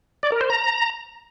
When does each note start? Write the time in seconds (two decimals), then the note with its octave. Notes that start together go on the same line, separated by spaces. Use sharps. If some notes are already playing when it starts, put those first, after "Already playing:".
0.23 D5
0.32 A#4
0.41 C5
0.50 A#5